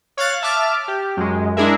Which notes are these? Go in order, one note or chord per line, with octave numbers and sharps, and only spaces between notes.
C#5 F5 F#6 A6
E5 A5 D6 F6
G4
F#2 G#3
G#3 D4 E4 G#4 A#4 E5